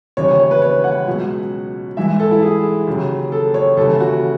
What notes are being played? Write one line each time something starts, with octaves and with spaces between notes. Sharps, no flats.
D#2 C#3 E3 C#5
C#5
C#5
B4
C#5
F#5
C#2 B2 F#3
G#2 E3 E5
A4
E4
G#4
D#2 C#3 F#3
A4
C#5
D#2 C#3 E3 A4
F#4